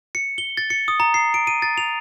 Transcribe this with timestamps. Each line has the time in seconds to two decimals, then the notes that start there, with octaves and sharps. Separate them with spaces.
0.15 C#7
0.38 G7
0.57 A6
0.70 C#7
0.88 D#6
1.00 A#5
1.14 C7
1.34 D7
1.47 D#7
1.62 A6
1.78 F7